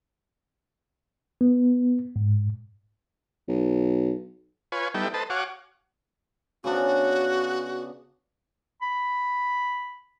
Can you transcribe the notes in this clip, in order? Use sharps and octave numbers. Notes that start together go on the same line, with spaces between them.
B3
G#2
B1
F4 B4 C#5 G#5
G3 B3 D#4 E4 A4 G5
A4 B4 C5 D#5 A5
F#4 C#5 F5 F#5 G#5 D6
C#3 B3 D4 F#4
B5